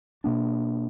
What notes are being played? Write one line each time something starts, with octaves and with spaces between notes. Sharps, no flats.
B2 A#3 D4